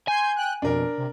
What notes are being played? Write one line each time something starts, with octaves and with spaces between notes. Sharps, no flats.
G#5 C6 G6 G#6
G5 F#6
F2 B2 D4 A#4
C3